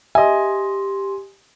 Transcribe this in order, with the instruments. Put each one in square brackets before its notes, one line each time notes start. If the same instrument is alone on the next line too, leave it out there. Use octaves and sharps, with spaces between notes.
[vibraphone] G4 C6 [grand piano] D#5 G#5 [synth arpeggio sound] E5